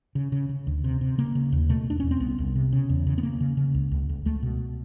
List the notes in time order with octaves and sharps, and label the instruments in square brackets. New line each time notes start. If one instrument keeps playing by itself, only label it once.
[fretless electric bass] C#3
C#3
C#3
D2
C3
C3
C#3 A#3
C#3
D#2
B2 A3
E2 D4
E2 C#4
C4
C2 B3
C2
C3
C#3
E2
C#3
B3
C#3 A#3
C#3
C#3
C#2
C#2
C#2
C#2 A3
B2